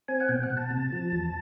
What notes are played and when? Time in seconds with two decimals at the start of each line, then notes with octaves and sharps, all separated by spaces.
0.08 C4 G#5
0.20 F#5
0.29 B2 G5
0.43 F#5
0.50 B2
0.57 A5
0.71 C3
0.92 F3
1.12 E2